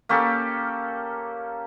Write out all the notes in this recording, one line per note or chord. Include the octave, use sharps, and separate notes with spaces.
A#3 C#4 G4 A4